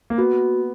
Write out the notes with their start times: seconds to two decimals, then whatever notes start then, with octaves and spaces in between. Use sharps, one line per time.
0.10 A#3
0.18 B3 F#4